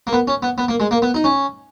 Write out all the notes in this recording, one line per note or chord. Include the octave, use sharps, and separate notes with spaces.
A#3
B3
C#4
B3
B3
A#3
G#3
A#3
B3
D#4
C#4